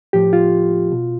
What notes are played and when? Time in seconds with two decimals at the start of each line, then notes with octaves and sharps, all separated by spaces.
0.13 A2 F3 G4
0.33 F4
0.92 B2